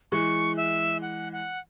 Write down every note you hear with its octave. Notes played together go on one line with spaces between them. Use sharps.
E3 G#3 C#6
E5
F#5
F#5